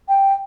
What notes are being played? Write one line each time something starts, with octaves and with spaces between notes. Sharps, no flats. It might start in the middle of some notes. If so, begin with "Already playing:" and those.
G5